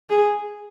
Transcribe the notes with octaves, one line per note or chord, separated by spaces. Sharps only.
G#4